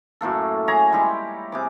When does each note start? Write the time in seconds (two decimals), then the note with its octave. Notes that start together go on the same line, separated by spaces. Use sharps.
0.21 F#2 A2 A#3 A4
0.68 G#4 C#5 G#5 A#5
0.92 G3 G#3 E4 G4
1.52 C3 G#4 D6